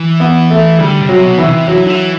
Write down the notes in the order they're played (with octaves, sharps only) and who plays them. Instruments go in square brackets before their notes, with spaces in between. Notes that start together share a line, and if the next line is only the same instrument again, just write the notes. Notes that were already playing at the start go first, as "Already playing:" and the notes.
Already playing: [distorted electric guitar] E3
[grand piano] B3
A3
[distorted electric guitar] D3 [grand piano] G3
[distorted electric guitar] C3
[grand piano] F#3
[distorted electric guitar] B2
[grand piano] E3
[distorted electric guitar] C3
[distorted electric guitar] E3 [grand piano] F#3
[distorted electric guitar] D3
E3